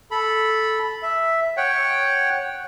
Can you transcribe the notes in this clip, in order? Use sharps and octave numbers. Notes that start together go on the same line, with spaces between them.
A4 B5
E5
C#5 F#5 G5